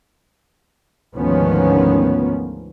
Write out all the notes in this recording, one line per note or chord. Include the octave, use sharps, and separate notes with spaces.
D2 G#2 D#3 F3 B3 C#4